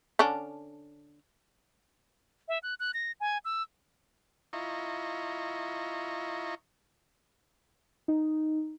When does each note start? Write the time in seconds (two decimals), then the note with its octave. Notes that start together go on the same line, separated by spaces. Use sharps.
0.19 D3 C#4 D4
2.48 E5
2.63 F#6
2.80 F#6
2.94 A#6
3.20 G#5
3.45 E6
4.53 E4 F4 D#5 A#5 C#6
8.08 D#4